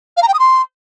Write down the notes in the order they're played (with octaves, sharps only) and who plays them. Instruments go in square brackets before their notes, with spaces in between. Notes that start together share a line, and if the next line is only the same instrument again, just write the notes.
[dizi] F5
A#5
G5
D#6
C6